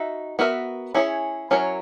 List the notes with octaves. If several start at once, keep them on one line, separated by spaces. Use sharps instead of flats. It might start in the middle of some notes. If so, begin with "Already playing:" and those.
Already playing: D#4 F#4 E5
B3 F#4 A#4 E5
C#4 E4 G#4 C#5
F#3 C#4 E4 A#4 C#5